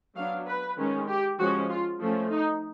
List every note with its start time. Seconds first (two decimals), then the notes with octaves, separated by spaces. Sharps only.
0.16 F#3 B3 D4 F5
0.47 B4
0.77 D#3 G#3 C#4
1.08 G4
1.39 F3 G#3 C#4 F#4
1.69 F4
2.00 F3 A3 C#4
2.30 D#4